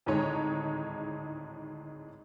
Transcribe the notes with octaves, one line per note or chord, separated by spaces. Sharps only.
G#1 D2 A2 G#3 D#4 C#5